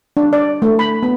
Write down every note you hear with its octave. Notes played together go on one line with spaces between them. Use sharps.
D4
D5
A3
B5
B3